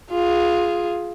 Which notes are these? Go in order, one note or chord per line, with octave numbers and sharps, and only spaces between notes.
F4 G#4